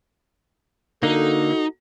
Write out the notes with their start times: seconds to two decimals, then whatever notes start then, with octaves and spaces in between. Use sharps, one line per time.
1.03 D3 A#3 D#4 F#4 A4